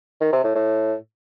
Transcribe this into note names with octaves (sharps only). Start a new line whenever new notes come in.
D#3
C3
A2
A2